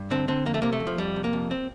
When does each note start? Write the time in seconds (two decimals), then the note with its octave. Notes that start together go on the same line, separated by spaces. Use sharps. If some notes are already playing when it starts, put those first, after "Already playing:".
Already playing: G2
0.11 D3 C4
0.28 D3 C4
0.46 F2 A#3
0.54 A3
0.62 C3 A#3
0.73 A3
0.80 F2
0.87 F3
0.98 F2 G3
1.16 C3
1.24 A#3
1.33 F2
1.51 C4